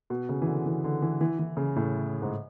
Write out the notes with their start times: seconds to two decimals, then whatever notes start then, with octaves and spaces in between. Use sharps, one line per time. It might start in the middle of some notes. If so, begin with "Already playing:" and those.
0.10 B2
0.29 C#3
0.42 E3
0.48 D3
0.66 E3
0.84 D3
1.02 E3
1.21 E3
1.39 E3
1.57 C#3
1.76 A2
2.22 G#2